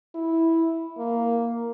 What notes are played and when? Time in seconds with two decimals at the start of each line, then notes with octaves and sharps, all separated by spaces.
0.15 E4
0.98 A#3